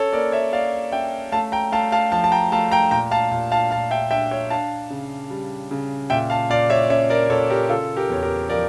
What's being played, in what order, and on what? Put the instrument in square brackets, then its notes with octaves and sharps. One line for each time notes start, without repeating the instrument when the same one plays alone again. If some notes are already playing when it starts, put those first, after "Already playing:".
Already playing: [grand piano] C#4 A4 C#5
A#3 A#4 D5
C#5 E5
A#3 D5 F5
C#4 E5 G5
A3 F5 A5
G5 A#5
A3 F5 A5
F5 A5
F3 F5 A5
A5
G5 A#5
A3 F5 A5
G5 A#5
A#2 G5 A#5
F5 A5
A#2
F5 A5
A#2 F5 A5
E5 G5
D4 E5 G5
C#5 E5
D4 F5 A5
C#3
G3
C#3
A#2 E5 G5
F5 A5
A#2 D5 F5
C#5 E5
C#4 C#5 E5
A#4 D5
A#2 A4 C#5
G4 A#4
C#3 F4 A4
G4 A#4
E2 C#5
G4 A#4
F3 A#4 D5